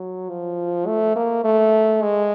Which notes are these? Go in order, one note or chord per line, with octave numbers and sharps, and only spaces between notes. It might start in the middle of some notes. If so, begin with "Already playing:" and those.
Already playing: F#3
F3
A3
A#3
A3
G#3